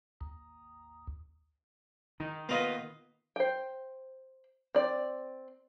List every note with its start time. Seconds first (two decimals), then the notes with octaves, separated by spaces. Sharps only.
0.21 D#2
2.20 D#3 D#4
2.49 A#3 B3 F4 B4 D#5
3.36 C5 G5
4.75 C4 D5